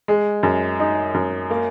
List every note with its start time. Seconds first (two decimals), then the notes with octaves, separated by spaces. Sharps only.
0.08 G#3
0.43 F#2
0.79 D#4
1.14 F#2
1.50 A#3